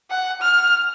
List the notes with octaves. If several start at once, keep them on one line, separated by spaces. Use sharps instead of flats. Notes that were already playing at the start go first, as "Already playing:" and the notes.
F#5
F6